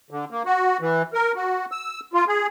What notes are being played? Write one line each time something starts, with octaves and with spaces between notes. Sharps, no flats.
D3
A#3
F#4
E3
A#4
F#4
E6
F4
G#4